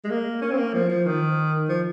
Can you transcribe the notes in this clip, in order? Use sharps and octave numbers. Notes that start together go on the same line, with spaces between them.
G#3
A#3
C#4
C4
A#3
F3
F3
D#3
F3